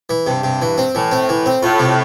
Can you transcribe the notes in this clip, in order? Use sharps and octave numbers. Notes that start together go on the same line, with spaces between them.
E3
G2 C3
C3
E3
C4
A2 E3
C4
E3
C4
A2 F4
C3